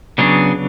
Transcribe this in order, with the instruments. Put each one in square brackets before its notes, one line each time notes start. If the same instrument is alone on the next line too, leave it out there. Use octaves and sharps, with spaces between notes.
[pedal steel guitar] C#3 F#3 B3 D4 G#4